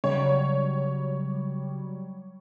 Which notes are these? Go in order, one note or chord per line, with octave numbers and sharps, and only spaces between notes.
C#3 F#3 G3 C#5